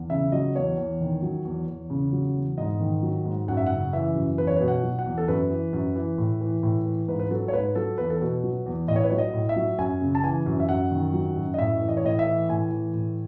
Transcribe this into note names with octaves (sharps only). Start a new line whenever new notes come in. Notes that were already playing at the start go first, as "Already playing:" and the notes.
Already playing: E2
C#3 E5
F#3 D#5
E2 C#5
E2
D#3
F#3
E2
E2
C#3
F#3
E2
G#2 D#5
D#3
F#3
G#2
F#2 F#5
E5
C#3 F#5
E3 E5
F#2
E2 B4
C#5
B2 B4
F#5
F#3
F#5
E2
A4
F#2 B4
E3
F#2
E3
A2
E3
A2
E3
G#2 B4
B4
F#3 A4
C#5
G#2 B4
F#3 A4
E2 B4
A4
B2 B4
F#3
E2
A2 D#5
C#5
B4
F#3 C#5
D#5
A2
E5
F#3
F#2 G#5
C#3
A5
E3 G#5
F#2
E5
F#2 F#5
D#3
F#3
F#2
D#5
A2 E5
E3
D#5
C#5
A2 D#5
E5
E3
A2 G#5
E3
A2